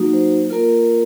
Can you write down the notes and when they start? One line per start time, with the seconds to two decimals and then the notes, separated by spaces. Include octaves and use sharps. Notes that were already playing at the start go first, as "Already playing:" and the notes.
Already playing: F#3 A#3 D#4 F#4
0.13 C5
0.50 A#3 F4 A#4